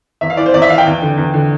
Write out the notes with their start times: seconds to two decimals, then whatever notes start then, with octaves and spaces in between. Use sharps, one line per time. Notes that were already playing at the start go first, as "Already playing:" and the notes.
0.21 E2 E5
0.30 F5
0.37 E3 D5
0.46 C5
0.54 E2 D5
0.62 E5
0.69 E3 F5
0.78 G5
0.86 E2
1.02 D3
1.18 E2
1.34 D3